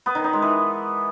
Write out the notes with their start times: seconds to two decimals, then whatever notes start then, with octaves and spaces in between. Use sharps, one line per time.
0.06 B3
0.15 D#3
0.24 D#4
0.33 G#3
0.42 E3